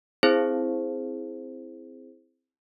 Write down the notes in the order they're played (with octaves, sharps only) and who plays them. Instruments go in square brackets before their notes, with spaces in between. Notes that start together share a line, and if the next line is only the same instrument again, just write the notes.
[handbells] C4 E4 G#4 C5